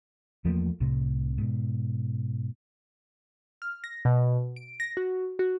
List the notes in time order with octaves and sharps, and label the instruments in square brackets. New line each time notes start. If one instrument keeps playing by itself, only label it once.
[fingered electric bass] E2 F3 A3 A#3
C2 A2 C3
G#2 B2
[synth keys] F6
A#6
B2
D7
A#6
F#4
F#4